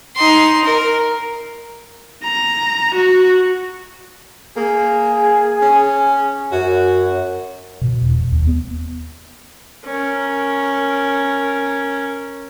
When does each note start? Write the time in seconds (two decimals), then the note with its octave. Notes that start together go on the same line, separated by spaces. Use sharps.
0.16 D#4 C6
0.64 A#4
2.24 A#5
2.95 F#4
4.57 A#3 G#4
5.62 C#4
6.52 F#2 F#4
7.81 B2
8.02 E1
8.32 D#2
8.47 B3
9.85 C#4 A#4